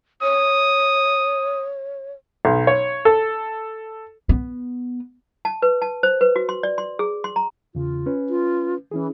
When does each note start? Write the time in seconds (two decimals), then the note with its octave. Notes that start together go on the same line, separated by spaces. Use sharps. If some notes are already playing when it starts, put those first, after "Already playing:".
0.22 C#5 D#6
2.45 B1
2.67 C#5
3.05 A4
4.29 B3
5.45 A5
5.62 B4
5.82 A5
6.03 C5
6.21 B4
6.36 F#4
6.49 C6
6.63 D5
6.78 C6
6.99 G#4
7.24 C6
7.36 A#5
7.75 E2 C#3 F4
8.06 C#4 B4
8.29 F4
8.91 E3 C#4 E4 G#4